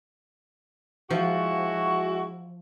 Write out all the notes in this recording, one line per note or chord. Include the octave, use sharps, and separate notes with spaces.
F3 G#3 E4 F#4